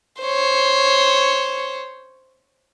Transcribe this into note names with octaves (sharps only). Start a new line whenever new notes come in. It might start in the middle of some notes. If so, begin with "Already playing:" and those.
C5 C#5